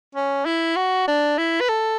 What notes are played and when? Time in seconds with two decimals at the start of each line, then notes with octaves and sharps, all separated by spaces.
0.15 C#4
0.46 E4
0.76 F#4
1.07 D4
1.38 E4
1.60 B4
1.69 A4